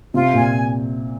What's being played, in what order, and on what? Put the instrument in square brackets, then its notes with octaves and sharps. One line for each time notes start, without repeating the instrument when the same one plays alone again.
[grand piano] C3 [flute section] F4
[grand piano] A#2 [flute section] G#5